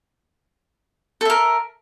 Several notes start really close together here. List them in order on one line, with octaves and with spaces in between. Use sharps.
A4 E5 A#4